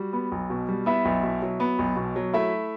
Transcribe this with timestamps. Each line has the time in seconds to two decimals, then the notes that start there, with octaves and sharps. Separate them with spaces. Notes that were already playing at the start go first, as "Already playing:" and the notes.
Already playing: G3 F#4
0.13 B3
0.32 B1
0.50 B2
0.69 G3
0.86 B3 E4 E5
1.05 B1
1.23 B2
1.42 F#3
1.60 B3
1.79 B1
1.96 B2
2.16 F#3
2.34 A3 E4 E5